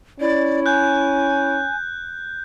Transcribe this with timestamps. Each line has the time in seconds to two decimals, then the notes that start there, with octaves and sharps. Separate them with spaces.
0.20 C#4 E4 D5
0.66 G#5 F#6 G6